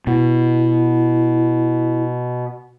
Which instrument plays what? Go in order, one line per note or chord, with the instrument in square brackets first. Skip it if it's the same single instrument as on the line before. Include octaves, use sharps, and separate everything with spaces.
[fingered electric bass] B2 [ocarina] E4